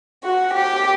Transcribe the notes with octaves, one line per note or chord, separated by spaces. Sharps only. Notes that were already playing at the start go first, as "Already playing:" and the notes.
F#4
G4